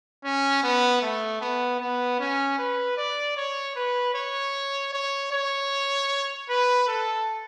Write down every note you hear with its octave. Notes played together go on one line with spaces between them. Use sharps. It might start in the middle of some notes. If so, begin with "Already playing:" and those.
C#4
B3
A3
B3
B3
C#4
B4
D5
C#5
B4
C#5
C#5
C#5
B4
A4